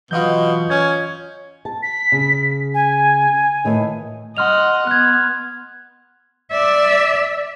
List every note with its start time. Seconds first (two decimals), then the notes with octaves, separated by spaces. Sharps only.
0.11 B2 E3 F#3 F4 D#5 G6
0.70 C#4 G#6
1.65 A5
1.83 B6
2.12 C#3
2.74 G#5
3.64 A2 D#3 E3
4.37 D#5 F#5 C6 F6 F7
4.87 B3 F#6 G#6
6.52 D5 E5